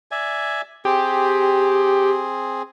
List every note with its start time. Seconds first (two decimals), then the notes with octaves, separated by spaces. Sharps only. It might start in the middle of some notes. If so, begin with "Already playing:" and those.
0.11 D5 E5 G#5
0.85 C4 G4 G#4